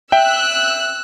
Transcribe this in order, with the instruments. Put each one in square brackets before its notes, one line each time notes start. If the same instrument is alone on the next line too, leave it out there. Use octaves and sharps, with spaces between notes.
[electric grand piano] E5 G5 [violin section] E6 F#6